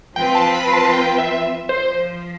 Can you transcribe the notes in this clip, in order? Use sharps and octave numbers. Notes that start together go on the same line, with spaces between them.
F3 C4 F4 B4 G5
A5
B5
A5
G5
E5
F3 C5